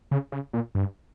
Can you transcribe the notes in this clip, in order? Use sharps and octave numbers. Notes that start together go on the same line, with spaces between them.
C#3
C#3
A#2
G2